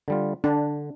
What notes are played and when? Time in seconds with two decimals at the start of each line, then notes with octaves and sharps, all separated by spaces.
0.08 D3 G3 F4
0.44 D3 D4